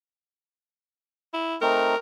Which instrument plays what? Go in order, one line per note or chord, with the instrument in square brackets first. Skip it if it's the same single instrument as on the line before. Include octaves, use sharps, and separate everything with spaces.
[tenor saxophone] E4
[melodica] A3 C4 D#4 [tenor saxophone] A#4